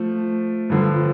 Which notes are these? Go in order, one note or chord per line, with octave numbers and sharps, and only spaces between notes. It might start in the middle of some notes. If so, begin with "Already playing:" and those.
Already playing: F3 A3
G2 D3 F3